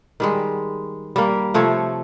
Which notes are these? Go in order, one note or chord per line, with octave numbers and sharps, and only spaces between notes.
D#3 G3 G#3
G3 A#3
C3 F3 A3 C#5